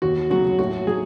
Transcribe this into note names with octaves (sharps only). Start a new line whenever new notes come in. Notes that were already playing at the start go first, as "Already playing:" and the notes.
D#2 F#4
C#3 F#3 F#4
A2 F#4
F#3 G#4